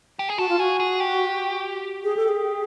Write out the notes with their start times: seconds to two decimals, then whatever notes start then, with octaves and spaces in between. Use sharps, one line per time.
0.19 G4
0.29 G#4
0.38 F#4 A4
0.49 F4
0.59 F#4 G#4
0.80 G#4
1.00 G4
2.04 G#4
2.17 A4
2.28 G#4